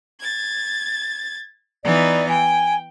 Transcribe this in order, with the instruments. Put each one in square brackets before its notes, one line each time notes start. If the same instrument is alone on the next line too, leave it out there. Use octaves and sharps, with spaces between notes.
[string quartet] G#6 A6
[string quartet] E3 B3 D#4 [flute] D5
[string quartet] G5 [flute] G#5